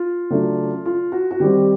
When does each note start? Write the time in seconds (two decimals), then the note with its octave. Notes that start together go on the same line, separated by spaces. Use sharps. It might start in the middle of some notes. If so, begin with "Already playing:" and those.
Already playing: F4
0.30 C#3 F#3 A3 D4
0.85 F4
1.12 F#4
1.31 F#4
1.40 D#3 G3 C4 G4